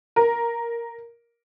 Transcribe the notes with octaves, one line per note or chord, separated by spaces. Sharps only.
A#4